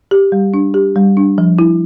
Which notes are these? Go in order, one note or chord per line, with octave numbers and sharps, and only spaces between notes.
G4
G3
D4
G4
G3
D4
F3
E4